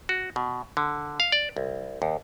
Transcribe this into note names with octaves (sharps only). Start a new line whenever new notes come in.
F#4
B2
D3
F5
D5
C2
D#2